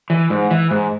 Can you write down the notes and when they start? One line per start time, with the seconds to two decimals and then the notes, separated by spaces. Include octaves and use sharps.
0.10 E3
0.30 G#2
0.51 E3
0.71 G#2